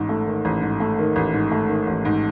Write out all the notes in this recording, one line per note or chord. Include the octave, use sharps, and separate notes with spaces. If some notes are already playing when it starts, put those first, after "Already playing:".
Already playing: A1 G#2
A3
D#3
A1
G#2
A3
D#3
A1
G#2
A3
D#3
A1
G#2